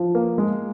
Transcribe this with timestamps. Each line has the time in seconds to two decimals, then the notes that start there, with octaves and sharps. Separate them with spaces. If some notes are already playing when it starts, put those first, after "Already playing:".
Already playing: F3
0.15 A#3
0.38 G#3